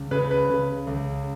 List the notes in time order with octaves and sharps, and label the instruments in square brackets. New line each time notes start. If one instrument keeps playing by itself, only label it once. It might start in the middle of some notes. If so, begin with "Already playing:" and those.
Already playing: [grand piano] C#2
C#3 B4
B4
C#3
C#2